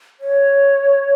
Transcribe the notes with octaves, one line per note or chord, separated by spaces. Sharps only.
C#5